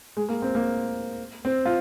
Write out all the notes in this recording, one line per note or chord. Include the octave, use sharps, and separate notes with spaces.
G#3
A#3
C4
A#3
C4
F4